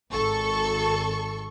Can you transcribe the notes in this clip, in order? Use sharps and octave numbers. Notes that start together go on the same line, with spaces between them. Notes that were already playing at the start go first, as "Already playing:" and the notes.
G#1 A4 C#6